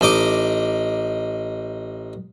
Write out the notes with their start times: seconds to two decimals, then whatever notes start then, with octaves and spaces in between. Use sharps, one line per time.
0.01 A1 D#4 D#5 D6